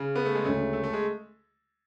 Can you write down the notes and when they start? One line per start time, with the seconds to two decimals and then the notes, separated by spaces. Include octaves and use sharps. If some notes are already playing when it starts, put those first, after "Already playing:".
Already playing: C#3
0.16 B3
0.26 A3
0.35 G#3
0.45 D2 C#3 G#3 A3 C#4
0.73 A3
0.84 A3
0.93 G#3